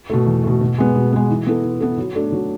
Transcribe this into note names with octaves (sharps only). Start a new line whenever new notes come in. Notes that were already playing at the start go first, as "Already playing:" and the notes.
B2 A3
E2
B2 A3
B2
G#3 B3
B2
G#3 B3
E3
B3 E4 A4
E3
B3 E4 A4
F#3
A3 D4 A4
F#3